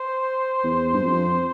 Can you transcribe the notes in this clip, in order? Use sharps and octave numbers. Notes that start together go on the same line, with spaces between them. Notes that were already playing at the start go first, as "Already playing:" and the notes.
Already playing: C5
E2
G2
F2